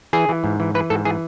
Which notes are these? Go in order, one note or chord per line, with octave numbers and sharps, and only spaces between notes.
E3 G#4
E3
G#2
E3
E3 B4
G#2 A4
E3 G#4